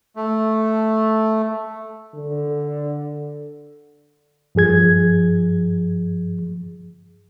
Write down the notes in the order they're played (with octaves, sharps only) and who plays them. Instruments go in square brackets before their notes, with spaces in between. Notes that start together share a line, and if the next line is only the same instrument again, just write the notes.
[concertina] A3
[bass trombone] D3
[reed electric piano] G2 F3 G#4 G#6